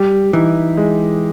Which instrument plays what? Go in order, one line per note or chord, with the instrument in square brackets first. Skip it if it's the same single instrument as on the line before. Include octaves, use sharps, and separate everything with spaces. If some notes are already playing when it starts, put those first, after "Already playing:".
Already playing: [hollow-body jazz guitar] G3 [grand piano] G4
[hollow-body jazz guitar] E3 [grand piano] D#4
[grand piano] G#3